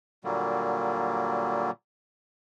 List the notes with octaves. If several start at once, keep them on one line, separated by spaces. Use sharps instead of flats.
A#2 D3 F#3 G3 A#3